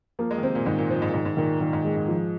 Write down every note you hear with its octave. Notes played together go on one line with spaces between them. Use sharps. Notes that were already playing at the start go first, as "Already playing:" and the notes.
F3 A#3
G#3
D#3
C3 C5
A#2
G#2 D#3
A#2
F3 C5
G#2
A#2
G#2 D#3
G#2
A#2 D#3
A#2 D#3
G#2
F2 G#3
G#2
F3